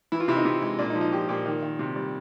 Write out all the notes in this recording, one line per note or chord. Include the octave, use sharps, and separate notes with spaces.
E3 E4
F4
C3 E4
D#4
C3
G#3
A#2 D4
D#4
F3
D#4
F3 G4
A#2 G4
D#3
D#3
C3
G3